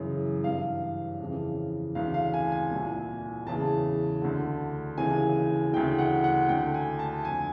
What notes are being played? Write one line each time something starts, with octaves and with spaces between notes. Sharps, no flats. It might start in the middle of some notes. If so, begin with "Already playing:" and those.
Already playing: F#2 C#3 E3
G2 E3 F5
F2 C#3 E3
D2 C#3 E3 F5
F5
G#5
G#5
C2 A#2
E2 C#3 E3 A5
D2 D3
D#2 C#3 E3 G#5
D2 C#3 E3 G5
F#5
F#5
D2 D3 G5
G#5
A5
F2 D3 G#5